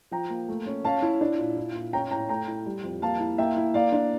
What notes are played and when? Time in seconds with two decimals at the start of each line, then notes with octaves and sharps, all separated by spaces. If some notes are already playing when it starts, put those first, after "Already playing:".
0.11 F3 G5 A#5
0.30 A#3
0.48 A3
0.66 C#4
0.85 C#4 F5 A5
1.02 E4
1.21 D4
1.38 A#2
1.57 E4
1.75 A#2
1.93 C#4 G5 A#5
2.11 A2 G5 A#5
2.29 A3 G5 A#5
2.47 E4
2.66 G3
2.83 F2
3.02 A#3 F5 A5
3.20 E4
3.38 A#3 E5 G5
3.57 E4
3.74 A#3 D5 F5
3.92 D4